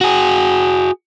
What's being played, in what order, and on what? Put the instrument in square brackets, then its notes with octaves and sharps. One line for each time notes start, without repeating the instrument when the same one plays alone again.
[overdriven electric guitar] F#4 G#4